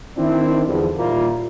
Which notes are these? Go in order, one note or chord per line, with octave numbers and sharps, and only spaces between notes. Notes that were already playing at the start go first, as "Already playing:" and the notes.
D#3 C4 D4 E4
E2 G2 D3 F3
D#2 A#2 G3 A#3 E4 F4